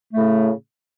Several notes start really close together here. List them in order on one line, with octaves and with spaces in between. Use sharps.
A3 A2 C#3